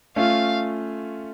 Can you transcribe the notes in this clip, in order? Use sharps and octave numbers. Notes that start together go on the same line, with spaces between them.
A3 C#4 F4 F5